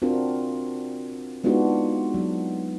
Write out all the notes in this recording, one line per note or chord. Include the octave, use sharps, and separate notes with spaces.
C4 D4 F4 F#4 A#4
G#3 B3 D4 D#4 F4 F#4
F#3